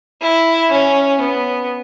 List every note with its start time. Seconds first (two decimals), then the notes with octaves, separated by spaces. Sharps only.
0.21 E4
0.71 C#4
1.21 B3